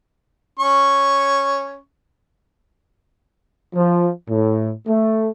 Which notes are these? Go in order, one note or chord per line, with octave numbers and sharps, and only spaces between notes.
C#4 C#6
F3
A2
A3